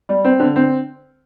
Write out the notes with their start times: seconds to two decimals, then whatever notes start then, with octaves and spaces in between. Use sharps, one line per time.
0.09 G3
0.25 C4
0.40 D3
0.56 C4